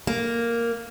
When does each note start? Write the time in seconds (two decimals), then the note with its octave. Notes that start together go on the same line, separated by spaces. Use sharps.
0.07 A#3